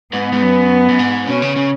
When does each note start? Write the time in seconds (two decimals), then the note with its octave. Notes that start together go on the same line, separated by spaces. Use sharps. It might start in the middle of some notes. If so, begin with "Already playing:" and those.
0.13 G#2 B3
0.32 G#2
0.43 F#2
0.89 F#2
0.99 G#2
1.27 B2 C#4
1.42 C#3
1.56 C#3